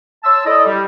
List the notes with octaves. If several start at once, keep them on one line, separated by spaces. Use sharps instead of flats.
C#5 A5 C6 E6
E4 A4 D5 D#5
G3